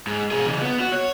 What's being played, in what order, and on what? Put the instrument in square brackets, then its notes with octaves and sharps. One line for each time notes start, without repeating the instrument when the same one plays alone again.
[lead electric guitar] G#2
B2 G#4
C#3 E3
B3
F#4
C#5